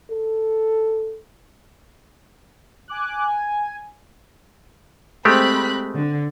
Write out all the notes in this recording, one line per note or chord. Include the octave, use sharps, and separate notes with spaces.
A4
G#5 D6 F#6
G#5
G#3 A3 C4 G4 B5 F#6
D3